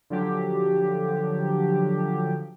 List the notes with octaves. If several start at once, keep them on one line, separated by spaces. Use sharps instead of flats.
D3 F3 F#3 G4